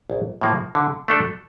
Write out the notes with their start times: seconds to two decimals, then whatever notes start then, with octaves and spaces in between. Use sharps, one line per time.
0.10 A#1
0.41 A2 F3 A#3
0.75 D3
1.08 A3 D4 A4